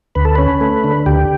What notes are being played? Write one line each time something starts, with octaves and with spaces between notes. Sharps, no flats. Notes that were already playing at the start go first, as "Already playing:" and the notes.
D2 B4
A4
C#4 B4
A3
D3
D2 G4